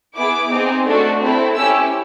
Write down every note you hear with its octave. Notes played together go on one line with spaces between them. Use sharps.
B3 E4 G#4 D6
C4 D#4 G#4
A3 D4 F#4 A4
C4 E4 A4
C#4 E4 G4 E6